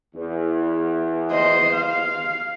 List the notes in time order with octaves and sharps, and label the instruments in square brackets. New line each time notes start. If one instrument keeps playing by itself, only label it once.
[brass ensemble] E2
[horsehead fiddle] C5 D#5
F5